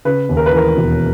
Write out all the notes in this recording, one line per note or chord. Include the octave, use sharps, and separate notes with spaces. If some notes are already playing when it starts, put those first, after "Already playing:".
C#3 B4
D#2
A#4
B4
E3 A#4
E1